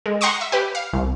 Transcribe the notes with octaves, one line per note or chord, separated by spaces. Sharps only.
G#3
F#5 A#5 C6 C#6 D#6
E5
G4 B4
F5
C2